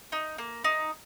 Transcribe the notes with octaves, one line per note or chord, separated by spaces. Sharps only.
D#4
A#3
D#4